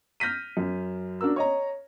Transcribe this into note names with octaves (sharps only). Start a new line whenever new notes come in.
F6 G6 A#6 B6 D#7
F#2
D4 F#4 A#4 E6
C#5 D#5 A#5